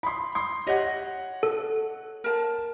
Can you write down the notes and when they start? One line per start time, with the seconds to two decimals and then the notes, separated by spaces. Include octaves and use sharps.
0.03 B5 C6
0.35 C6
0.67 G4 C#5 D#5 E5 F#5
1.43 A4
2.24 A#4 A5